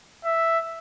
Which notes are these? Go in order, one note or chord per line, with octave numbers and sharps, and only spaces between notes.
E5